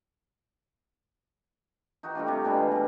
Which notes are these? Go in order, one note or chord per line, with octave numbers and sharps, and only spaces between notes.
D#4 F#4 G4 A#5
G3 A3 D4 F4
C3 F5
B2 G#3 D4 B5
E3
B2 G3